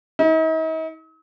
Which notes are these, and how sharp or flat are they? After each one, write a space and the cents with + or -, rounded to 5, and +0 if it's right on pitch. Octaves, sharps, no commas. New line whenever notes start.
D#4 +45